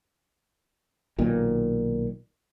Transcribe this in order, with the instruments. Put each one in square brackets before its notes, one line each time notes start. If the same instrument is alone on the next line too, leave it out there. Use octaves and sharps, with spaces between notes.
[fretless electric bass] B1 A#2 D#3